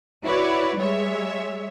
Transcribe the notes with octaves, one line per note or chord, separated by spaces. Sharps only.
E4 F#4 B4 C#5 D5
G3 G#3 C#5 E5